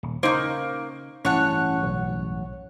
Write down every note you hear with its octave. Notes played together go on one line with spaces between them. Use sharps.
D#1
C#3 A#3 D#4 C5 A#5 C#6
A1 G2 C#4 E4 C#5 F#5 A5
B1